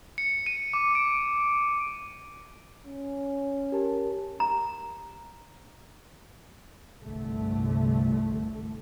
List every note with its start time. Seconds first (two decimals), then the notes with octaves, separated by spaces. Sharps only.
0.18 C#7
0.46 D#7
0.74 D6
0.95 D7
2.86 C#4
3.72 G4 A#4 A5
4.40 A#5
7.01 G1 C2 D3 A3